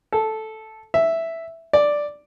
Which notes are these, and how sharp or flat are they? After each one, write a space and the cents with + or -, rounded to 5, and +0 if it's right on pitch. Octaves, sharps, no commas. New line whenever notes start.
A4 -5
E5 +0
D5 +0